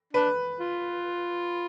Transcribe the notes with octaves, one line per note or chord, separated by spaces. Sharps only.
D4 B4
F4